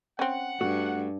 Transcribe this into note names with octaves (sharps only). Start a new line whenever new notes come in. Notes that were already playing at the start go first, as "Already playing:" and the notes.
C4 C#4 F#5
G2 A3 F#4